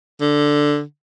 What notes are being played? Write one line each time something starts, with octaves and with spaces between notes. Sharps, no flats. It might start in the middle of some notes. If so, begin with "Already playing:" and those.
D3